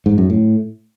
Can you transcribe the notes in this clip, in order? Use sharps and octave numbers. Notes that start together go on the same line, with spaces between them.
G#2
F#2
A2